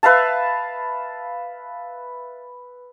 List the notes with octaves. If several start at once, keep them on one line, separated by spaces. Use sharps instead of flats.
B4 E5 F5 A5